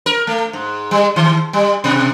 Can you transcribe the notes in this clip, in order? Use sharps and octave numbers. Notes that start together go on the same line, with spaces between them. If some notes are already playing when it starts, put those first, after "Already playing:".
A#4
A3
G#2
G3
D#3
G3
B2